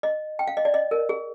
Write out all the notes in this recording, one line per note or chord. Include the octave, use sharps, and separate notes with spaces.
D#5
G5
F5
D#5
D5
D#5
A#4
G#4